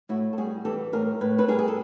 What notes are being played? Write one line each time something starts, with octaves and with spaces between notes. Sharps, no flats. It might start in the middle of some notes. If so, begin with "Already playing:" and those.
A2 E4 F#4
A4
G3 F#4 G#4
E3 G4 A4
A2 G#4 A#4
A2 B4
A4 B4
G3 G#4 A#4
G#4
A4